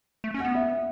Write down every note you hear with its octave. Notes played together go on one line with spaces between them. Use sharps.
A3
C#4
F#5
B3
E5